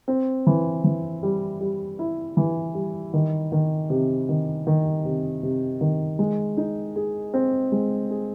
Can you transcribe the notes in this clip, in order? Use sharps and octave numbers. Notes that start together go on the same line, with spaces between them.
C4
E3
E3
G3
G3
E4
E3
G3
D#3
D#3
C3
D#3
D#3
C3
C3
D#3
G#3
D#4
G#4
C4
G#3
G#4